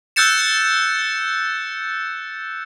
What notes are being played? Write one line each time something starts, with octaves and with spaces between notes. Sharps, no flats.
E6 F#6 G6 A6 C#7 E7